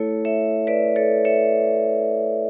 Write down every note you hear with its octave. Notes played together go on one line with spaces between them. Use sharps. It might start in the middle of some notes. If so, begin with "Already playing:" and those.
Already playing: A3 E4 A4 C#5
C#5 E5
B4 D5
A4 C#5
C#5 E5